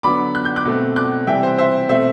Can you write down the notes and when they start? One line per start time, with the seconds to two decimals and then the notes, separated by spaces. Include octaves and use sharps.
0.03 D3 F#3 B3 B5 D6
0.35 F#6
0.45 G6
0.56 D6 F#6
0.65 B2 A3 C4
0.96 D6 F#6
1.27 C3 E3 G3 E5 G5
1.43 C5
1.58 C5 E5
1.89 B2 A3 C4 C5 E5